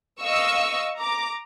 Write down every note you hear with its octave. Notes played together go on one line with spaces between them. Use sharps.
D#5 F5 C#6 E6
A#5 D6